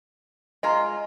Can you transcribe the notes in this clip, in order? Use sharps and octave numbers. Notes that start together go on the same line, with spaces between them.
G#3 F4 D#5 A#5 C6